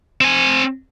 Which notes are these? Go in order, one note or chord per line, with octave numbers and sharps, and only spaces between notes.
C4 G#5